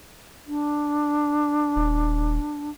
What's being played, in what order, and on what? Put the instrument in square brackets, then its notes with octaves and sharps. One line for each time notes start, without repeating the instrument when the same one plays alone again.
[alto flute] D4
[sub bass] D#1